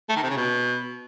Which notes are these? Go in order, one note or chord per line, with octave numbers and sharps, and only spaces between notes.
A3
D#3
C3
C#3
B2